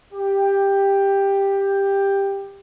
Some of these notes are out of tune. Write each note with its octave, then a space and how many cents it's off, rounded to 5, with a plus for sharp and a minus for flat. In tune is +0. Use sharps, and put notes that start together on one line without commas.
G4 +10